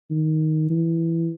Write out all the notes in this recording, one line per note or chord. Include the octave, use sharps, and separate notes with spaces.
D#3
E3